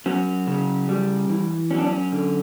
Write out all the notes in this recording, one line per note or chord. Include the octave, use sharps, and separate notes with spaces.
F#3 C#4
C#3
G3
E3
F#3 C#4
D4
C#4
D3